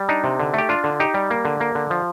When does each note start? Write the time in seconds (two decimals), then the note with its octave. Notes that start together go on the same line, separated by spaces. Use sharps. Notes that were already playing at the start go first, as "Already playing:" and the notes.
Already playing: G3
0.09 D4 D#4
0.24 C3
0.40 D3
0.54 A3 G4
0.69 D4 F4
0.84 D3
1.00 D#4 G4
1.14 G3
1.30 A#3
1.45 D3
1.60 A#3
1.75 D3
1.90 F3